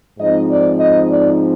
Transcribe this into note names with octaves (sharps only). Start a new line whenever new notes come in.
G#2 F3 C4 D#4 D#5
D5
D#5
D5